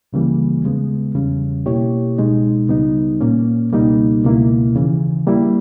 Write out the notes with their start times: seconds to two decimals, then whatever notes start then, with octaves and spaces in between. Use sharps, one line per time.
0.13 C#2 C#3 E3 G3 A#3
0.64 D#2 C#3 G#3 B3
1.15 E2 C#3 G3 C#4
1.66 B2 A#3 E4 G4 C#5
2.18 C#2 B2 G#3 D#4
2.69 C#2 C#3 G3 B3 D#4
3.20 A#2 A#3 C#4
3.73 C#2 B2 G3 A#3 D#4
4.24 C#2 B2 A#3 E4
4.75 D#2 C#3 E3
5.27 G3 A#3 E4